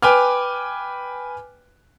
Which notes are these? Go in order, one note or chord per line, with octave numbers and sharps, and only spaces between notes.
B4 G5 G#5 D6 F6